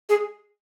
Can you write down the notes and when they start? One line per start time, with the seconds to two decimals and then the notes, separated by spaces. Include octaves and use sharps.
0.09 G#4